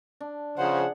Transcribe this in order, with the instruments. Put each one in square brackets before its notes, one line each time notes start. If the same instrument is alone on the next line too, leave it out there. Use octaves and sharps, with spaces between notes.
[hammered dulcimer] D4
[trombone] C#3 [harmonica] F3 C5 [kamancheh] G#4 F#5